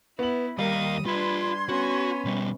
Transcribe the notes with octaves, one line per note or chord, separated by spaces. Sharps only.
B3 E4 F#7
D#2 G3 A#4 F5 D#6
D4 F4 B4 B5 C6 G#6
B3 C#4 F#4
B2 G3